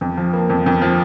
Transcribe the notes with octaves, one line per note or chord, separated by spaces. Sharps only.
F2
F3
A#3
F2
F2
F3